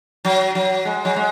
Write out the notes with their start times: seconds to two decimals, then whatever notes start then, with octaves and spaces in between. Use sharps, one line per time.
0.25 F#3
0.55 F#3
0.85 G#3
1.05 F#3
1.16 G#3